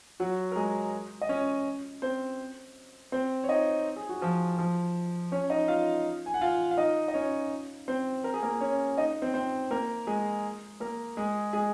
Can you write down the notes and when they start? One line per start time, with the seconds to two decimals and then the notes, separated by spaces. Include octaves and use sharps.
0.20 F#3 F#4
0.52 A#4
0.56 G#3 G#4
1.21 D#5
1.29 C#4 C#5
2.02 C4 C5
3.12 C4 C5
3.44 C#5
3.49 D#4 D#5
3.96 G#4
4.09 F#4
4.21 F3 F4
4.58 F3 F4
5.32 C#4 C#5
5.50 D#4 D#5
5.68 F4 F5
6.26 G#5
6.34 F#5
6.41 F4 F5
6.71 F5
6.78 D#4 D#5
7.08 D#5
7.14 C#4 C#5
7.88 C4 C5
8.24 A#4
8.34 G#4
8.42 A#3 A#4
8.61 C#4 C#5
8.98 D#4 D#5
9.22 C4 C5
9.34 C4 C5
9.71 A#3 A#4
10.07 G#3 G#4
10.80 A#3 A#4
11.17 G#3 G#4
11.53 G#3 G#4